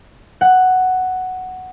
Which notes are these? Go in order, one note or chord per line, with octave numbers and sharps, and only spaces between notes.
F#5